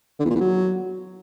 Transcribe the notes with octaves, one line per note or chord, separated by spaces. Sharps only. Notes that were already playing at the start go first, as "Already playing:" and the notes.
D3
E2
A#2
E2
F#3